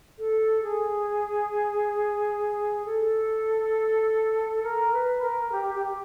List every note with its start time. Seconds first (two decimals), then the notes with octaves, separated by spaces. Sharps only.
0.18 A4
0.62 G#4
2.85 A4
4.63 A#4
4.93 B4
5.22 A#4
5.51 G4
5.74 G4